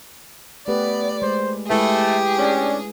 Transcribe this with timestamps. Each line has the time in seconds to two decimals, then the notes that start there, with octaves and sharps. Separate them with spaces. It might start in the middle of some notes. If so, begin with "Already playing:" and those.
0.68 A3 B3 G4 B4 D5
1.22 G#3 C5
1.70 G#3 A3 E4 G4 G#4 B4
2.39 C#4 D4